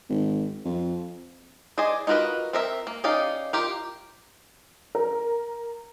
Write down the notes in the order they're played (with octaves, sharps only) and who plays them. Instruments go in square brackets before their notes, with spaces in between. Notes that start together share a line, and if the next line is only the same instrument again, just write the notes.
[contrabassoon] G#1
F2
[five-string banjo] G#4 C5 D5 D#5 G#5
D#4 F4 F#4 A#4 B4
C4 A#4 E5
A#3
C#4 D#4 G4 D5 F5
F4 G4 A#4
[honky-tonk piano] A#4